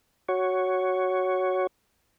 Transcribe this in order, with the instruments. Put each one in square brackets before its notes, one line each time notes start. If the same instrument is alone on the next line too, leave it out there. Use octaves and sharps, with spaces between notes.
[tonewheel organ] F#4 C#5